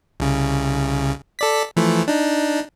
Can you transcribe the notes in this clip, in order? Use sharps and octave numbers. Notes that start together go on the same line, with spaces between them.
C2 C#3
A4 D5 B6
E3 F3 A3
D4 D#4